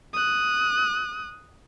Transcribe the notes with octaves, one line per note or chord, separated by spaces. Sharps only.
D#6 F#6